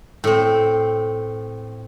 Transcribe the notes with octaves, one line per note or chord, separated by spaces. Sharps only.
A2 C4